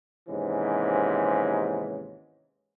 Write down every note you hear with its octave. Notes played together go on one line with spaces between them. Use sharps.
D#2 G#2 C3 E3 C#4